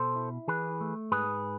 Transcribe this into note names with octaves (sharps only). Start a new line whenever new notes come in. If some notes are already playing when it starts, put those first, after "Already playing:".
Already playing: B2 A4 C5
E4
E3 G#4 B4
A3
G#2 G#4 B4